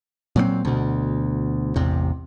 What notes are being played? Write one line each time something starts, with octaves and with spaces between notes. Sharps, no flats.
A#2 F#3 G3 C4
D2 B2
A1 E2 C3